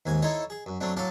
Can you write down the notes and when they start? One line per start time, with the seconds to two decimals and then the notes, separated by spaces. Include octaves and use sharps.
0.06 D#2 G#2 G#5
0.22 D#4 E4 A4 C5 C#5 D#5
0.50 G#4
0.66 F#2
0.81 F#3 A3 C4 D4
0.97 A2 F#3 A4 F5 A5 D6